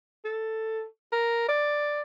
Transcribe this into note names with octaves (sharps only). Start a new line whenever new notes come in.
A4
A#4
D5